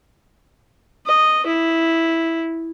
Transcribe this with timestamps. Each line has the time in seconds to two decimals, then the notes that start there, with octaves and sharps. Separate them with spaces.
1.07 D#5
1.46 E4